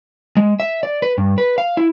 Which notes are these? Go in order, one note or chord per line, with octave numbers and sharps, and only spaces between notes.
G#3
E5
D5
B4
G2
B4
F5
E4